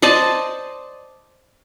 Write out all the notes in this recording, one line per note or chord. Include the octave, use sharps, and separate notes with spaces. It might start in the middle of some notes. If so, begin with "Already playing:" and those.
C5 D5 D#5 A5